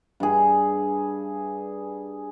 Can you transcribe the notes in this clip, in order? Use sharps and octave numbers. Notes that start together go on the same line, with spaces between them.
G2 G#4